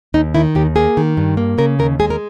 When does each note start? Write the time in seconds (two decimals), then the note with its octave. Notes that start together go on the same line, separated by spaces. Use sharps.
0.14 D#2 D#4
0.35 D#3 E4
0.55 D#2 G4
0.76 A#3 G#4
0.97 D#3
1.17 G2
1.37 A#3
1.58 C#3 A#4
1.79 D#2 A#4
2.00 G#3 G#4
2.10 A#4